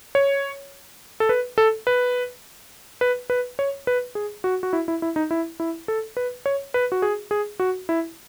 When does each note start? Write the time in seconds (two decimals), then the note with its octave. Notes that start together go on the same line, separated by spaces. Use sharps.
0.15 C#5
1.20 A4
1.29 B4
1.58 A4
1.87 B4
3.01 B4
3.30 B4
3.59 C#5
3.87 B4
4.15 G#4
4.44 F#4
4.63 F#4
4.73 E4
4.88 E4
5.02 E4
5.16 D#4
5.31 E4
5.60 E4
5.88 A4
6.17 B4
6.46 C#5
6.74 B4
6.92 F#4
7.02 G#4
7.31 G#4
7.60 F#4
7.89 E4